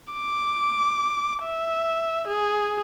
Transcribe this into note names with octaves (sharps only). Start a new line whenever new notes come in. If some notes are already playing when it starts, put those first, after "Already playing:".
D6
E5
G#4